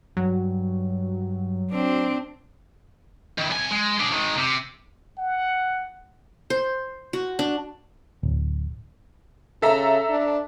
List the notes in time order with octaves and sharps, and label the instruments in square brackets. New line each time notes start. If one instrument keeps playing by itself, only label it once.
[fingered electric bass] G2 [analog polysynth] F#3
[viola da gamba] C4 D4
[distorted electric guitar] D#3 E4
C2 G#5
G#3
D4 G#4
D#3 G#3
C3
[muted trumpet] F#5
[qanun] C5
F#4
D4
[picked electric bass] D1
[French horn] C#3 [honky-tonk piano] A4 E5 A#5
[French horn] D4